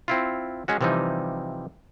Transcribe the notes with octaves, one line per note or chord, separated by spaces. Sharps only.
C4 E4 F4
G#3 C#4 F#4
C3 E3 F3 G3 D#4